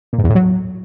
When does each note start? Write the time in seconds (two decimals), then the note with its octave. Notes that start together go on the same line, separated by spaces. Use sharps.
0.13 A#2
0.18 G#2
0.24 E2
0.30 A2
0.35 F#3